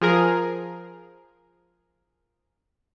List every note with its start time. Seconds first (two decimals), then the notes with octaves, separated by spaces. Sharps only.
0.01 F3 G#4 A#4